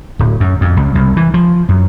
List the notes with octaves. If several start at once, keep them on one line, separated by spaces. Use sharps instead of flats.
D1
F#2
F2
C#2
C2
E3
F3
F#2